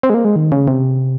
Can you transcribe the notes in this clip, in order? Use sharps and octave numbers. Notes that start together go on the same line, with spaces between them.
C4
G#3
A#3
G#3
D#3
C#3
C3